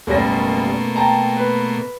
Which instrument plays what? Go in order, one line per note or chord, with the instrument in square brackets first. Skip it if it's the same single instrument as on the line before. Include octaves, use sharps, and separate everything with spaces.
[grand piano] F#1 G3 A#6 [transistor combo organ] B2 A3 A#3
[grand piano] G5 A5 A#5
B4